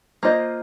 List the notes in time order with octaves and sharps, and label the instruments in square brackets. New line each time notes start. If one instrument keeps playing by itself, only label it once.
[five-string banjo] A#3 F4 C5 D#5